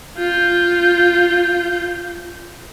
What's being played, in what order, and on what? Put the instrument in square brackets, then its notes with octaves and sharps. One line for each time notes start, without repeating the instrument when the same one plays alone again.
[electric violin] F4 G6